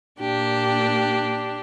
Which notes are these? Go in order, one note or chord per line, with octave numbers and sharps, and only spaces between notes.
A#2 A#3 D4 G4